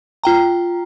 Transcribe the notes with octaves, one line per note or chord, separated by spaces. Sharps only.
F4 G5 A#5